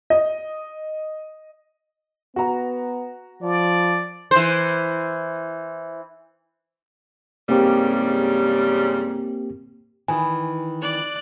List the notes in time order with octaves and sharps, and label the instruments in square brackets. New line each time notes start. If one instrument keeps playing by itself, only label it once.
[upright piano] D#5
[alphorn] B3 [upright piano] F#4 A#5
[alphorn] F3 [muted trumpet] D5
[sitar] E3 C5
[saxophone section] G#2 C#3 G3 [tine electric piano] A#3 C4 G4
[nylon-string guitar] D#3 E3 [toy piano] G#5
[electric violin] D5 F#6